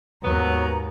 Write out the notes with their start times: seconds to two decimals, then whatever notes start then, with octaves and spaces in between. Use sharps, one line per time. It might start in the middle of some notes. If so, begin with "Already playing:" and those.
0.23 D#2 G#2 F#3 B3 A#5